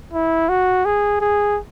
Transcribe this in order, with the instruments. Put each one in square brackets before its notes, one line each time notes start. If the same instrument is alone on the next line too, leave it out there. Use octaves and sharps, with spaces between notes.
[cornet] E4
F#4
G#4
G#4